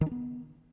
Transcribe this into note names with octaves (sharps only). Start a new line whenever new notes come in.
D#3
D4
B3